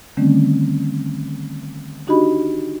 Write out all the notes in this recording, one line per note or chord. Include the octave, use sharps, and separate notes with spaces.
D3 D#3 G3 A3 C4 C#4
D4 D#4 F#4 G4 D#5 B5